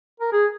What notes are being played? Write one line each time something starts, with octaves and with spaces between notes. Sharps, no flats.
A#4
G#4